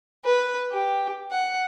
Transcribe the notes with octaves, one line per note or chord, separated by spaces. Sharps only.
B4
G4
F#5